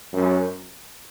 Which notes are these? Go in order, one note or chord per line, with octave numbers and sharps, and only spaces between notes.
F#2